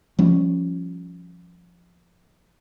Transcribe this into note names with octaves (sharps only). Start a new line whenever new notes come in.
F3 G3 C#4